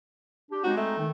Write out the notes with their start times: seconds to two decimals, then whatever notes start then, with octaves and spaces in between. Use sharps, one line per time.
0.51 D4 G4
0.64 G#3 C4 D#4 F#4
0.77 A3
0.97 D#3